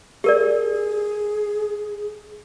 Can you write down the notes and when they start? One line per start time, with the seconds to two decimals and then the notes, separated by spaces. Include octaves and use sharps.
0.24 G4 G#4 A#4 D5